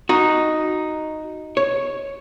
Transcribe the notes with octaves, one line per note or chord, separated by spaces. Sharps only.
D#4 F#4
C#5